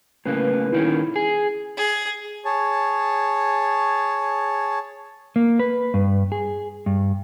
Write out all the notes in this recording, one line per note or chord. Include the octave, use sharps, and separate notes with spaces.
A2 C#3 A#3 B4
A#2 D#3 C#4 E4
G#4
G#4
G#4 C#5 A5
A#3
B4
G2
G#4
G2